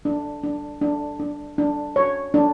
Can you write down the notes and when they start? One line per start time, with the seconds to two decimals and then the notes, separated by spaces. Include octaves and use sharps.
0.05 D4
0.43 D4
0.81 D4
1.20 D4
1.58 D4
1.96 C#5
2.34 D4